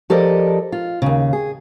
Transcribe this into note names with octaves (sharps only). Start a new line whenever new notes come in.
F3 G4 A4 A#4 D5 D#5
F4
D#2 C#3
G#4